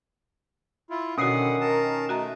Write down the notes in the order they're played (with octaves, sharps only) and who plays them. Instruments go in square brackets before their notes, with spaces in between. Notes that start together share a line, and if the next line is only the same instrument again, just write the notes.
[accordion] E4 F4
[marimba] B2 F#4 [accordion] D3 F#5 [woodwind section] D#3 [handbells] C#4 D#6 C7
[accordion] A#4 A5
[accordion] A3 [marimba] F#4 D#5 A#5